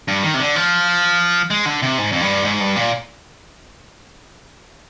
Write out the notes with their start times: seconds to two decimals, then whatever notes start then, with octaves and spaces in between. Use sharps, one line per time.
0.08 G2
0.23 D#3
0.34 C3
0.40 D3
0.56 F3
1.50 G#3
1.66 D3
1.82 C3
1.98 G#2
2.12 F2
2.21 G2
2.45 G#2
2.60 G2
2.76 A#2